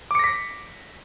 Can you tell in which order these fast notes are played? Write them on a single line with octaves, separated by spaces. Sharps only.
D6 C#7 A#6 B6